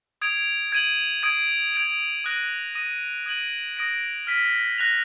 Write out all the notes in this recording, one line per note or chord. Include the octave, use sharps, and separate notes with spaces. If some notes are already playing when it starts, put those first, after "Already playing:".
D#6 G#6 D7 F7
G#6 D#7 F#7
D#6 G#6 D7
G#6 D7 F7
D#6 F#6 A#6 D#7 F#7
D#6 A#6 D#7
D#6 G#6 D#7 F#7
D#6 A#6 D7
F6 B6 D#7
F#6 A#6 F7